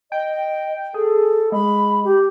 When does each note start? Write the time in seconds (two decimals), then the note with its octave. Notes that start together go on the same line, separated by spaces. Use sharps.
0.12 D#5 G5
0.94 G#4 A4
1.52 G#3 B5
2.04 G4